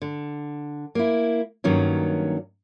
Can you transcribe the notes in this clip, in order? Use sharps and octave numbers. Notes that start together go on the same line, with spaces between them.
D3
A#3 E4
G2 D#3 F#3 A#3 C#4